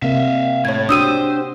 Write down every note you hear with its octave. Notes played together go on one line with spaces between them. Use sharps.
C3 A#3 E5 F5
A2 C#5 G#6
D4 F#4 G4 C5 D#6 E6 D#7